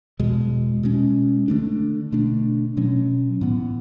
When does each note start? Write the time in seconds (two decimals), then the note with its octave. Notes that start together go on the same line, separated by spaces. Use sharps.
0.19 E2 B2 G#3
0.83 B2 G#3 C#4
1.48 D3 A3 D4
2.12 B2 A3 D4
2.77 B2 F#3 C#4
3.41 A2 E3 B3